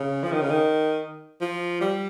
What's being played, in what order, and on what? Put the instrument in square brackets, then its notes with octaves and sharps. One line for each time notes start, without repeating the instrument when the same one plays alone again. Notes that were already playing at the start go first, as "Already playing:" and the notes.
Already playing: [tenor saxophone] C#3
F3
D#3
C#3
D#3
F3
G3